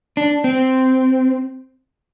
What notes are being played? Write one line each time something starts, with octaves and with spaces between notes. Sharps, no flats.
D4
C4